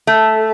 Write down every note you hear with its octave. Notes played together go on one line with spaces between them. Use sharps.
A3